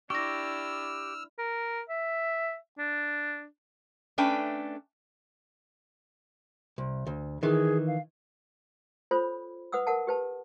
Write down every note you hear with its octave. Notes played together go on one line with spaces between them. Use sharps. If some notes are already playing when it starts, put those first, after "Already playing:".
D4 E4 G4 C#6 E6 F6 A#6
A#4
E5
D4
A3 C#4 D4 B4 G5
C2
D2
D#3 E3 G#4
F5
F4 A4 C5 C#5 B5
B4 F#5 D#6 E6
A#4 F#5 A5
G4 B4 A5